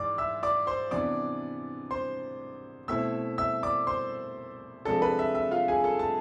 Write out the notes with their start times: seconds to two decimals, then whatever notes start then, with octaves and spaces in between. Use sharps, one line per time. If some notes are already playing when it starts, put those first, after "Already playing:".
Already playing: G#2 E3 D5 D6
0.18 E5 E6
0.43 D5 D6
0.67 C5 C6
0.91 C3 E3 B3 D4 D5 D6
1.91 C5 C6
2.88 B2 A3 C4 E4 E5 E6
3.38 E5 E6
3.63 D5 D6
3.87 C5 C6
4.85 C3 F3 G#3 D4 A4 A5
5.01 B4 B5
5.19 E5
5.35 E5
5.51 F4 F5
5.68 G#4 G#5
5.84 A4 A5
5.99 A5